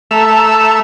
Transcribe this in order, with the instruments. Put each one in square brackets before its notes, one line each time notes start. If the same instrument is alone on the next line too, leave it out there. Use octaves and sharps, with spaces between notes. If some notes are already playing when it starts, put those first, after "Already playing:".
[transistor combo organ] A3 E5 [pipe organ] A5 A#5